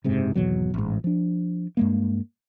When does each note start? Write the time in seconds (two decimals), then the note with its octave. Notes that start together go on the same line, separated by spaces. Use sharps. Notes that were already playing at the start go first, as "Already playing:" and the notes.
0.04 F#1 G#2 C3
0.35 G#1 E2 B2 F#3
0.74 A1 G#2
1.04 F3 D4
1.77 G2 G#3 A#3